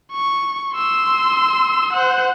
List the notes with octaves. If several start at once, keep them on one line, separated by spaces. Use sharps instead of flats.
C#6
C6 E6
C5 F#5